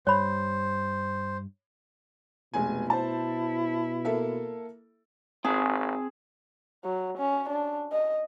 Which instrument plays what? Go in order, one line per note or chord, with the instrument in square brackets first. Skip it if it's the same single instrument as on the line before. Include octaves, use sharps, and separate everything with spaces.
[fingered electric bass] G2 [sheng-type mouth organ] C5 [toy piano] C#5 B5
[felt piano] F1 G#3 G#5 [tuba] B2
[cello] E4 [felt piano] C5 A5
[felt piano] A#3 A4 E5
[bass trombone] G#1 [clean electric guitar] C4 A5 [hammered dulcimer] G#4
[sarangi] F#3
C#4
D4
D#5